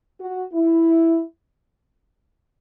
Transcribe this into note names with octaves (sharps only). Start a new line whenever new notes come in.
F#4
E4